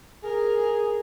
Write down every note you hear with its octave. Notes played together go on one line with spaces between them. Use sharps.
G#4 A#4